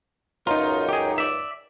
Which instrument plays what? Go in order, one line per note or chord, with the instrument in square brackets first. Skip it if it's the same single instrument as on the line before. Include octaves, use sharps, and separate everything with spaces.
[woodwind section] C#2 F#2 [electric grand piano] D#4 A#5 [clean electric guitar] F4
[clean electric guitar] G4 G#4
D5 E5